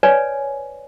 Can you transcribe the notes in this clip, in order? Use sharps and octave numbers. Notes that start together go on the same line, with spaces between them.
B4 C#5 D5 G#5